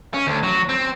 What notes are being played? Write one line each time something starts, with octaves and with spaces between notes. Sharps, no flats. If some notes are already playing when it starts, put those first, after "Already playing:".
C#4
D2
F#3
C4